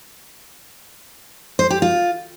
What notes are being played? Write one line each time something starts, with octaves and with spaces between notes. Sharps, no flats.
C5
G4
F4